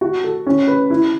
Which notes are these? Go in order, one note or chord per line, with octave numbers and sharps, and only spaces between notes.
F#4
A4
C#4
B4
E4